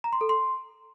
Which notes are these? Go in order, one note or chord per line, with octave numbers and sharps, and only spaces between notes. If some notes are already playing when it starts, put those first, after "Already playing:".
A#5
C6
A4
C6